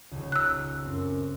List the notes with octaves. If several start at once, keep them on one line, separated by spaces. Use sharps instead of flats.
D#1 C#2
A#5 E6 F#6
F#2 C4